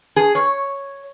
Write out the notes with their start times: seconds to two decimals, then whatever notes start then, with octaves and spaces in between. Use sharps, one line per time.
0.16 G#4
0.35 C#5